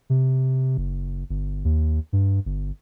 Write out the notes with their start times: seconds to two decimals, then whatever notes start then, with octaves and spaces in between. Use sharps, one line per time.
0.10 C3
0.77 F#1
1.30 G1
1.64 D#2
2.13 G2
2.45 G1